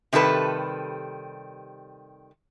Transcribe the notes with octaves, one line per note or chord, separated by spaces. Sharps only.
C3 D#3 G3 A4 B4